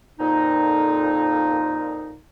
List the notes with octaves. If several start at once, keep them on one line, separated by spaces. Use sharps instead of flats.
F2 A#2 D#4